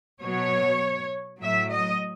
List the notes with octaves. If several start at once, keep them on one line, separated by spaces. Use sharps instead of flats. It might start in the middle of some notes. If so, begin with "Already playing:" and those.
B2 F#3 C#5
A2 F#3 E5
D#5